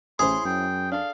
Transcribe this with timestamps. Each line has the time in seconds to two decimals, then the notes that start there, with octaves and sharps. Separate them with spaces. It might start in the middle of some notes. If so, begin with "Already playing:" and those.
0.19 A1 C#4 E4 G#4 C5 C6
0.45 F#2 G5
0.92 D4 A4 F5